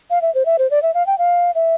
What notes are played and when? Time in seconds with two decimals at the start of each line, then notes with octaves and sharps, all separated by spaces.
0.10 F5
0.22 E5
0.35 C5
0.46 E5
0.59 C5
0.71 D5
0.83 E5
0.94 F5
1.07 G5
1.18 F5
1.55 E5